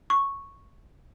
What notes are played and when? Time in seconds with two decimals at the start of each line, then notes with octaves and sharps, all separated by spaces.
0.10 C#6